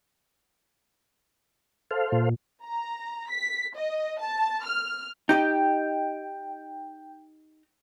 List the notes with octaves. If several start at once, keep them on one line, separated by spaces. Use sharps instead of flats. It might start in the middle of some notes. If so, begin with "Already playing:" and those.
A4 C5 F5
A#2
A#5
B6
D#5
A5
F6
D#4 G4 D#5 G5